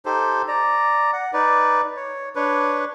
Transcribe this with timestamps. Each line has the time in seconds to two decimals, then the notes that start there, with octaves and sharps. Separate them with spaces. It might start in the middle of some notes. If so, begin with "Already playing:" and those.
0.06 D#4 G4 A4 C5
0.48 D5 A#5
1.13 F#5
1.33 D#4 B4 D5
1.96 C#5
2.35 D4 B4 C#5